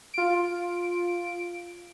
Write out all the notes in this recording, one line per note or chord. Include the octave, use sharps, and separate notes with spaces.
F4 D7